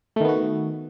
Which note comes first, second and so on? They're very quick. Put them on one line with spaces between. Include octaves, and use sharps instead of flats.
A3 D#3 B3 F#4